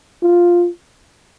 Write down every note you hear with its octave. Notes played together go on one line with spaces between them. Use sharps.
F4